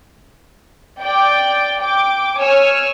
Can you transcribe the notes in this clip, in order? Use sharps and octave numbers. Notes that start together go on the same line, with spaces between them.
D5 G5
G5 D6
C#5 G#5 E6 F6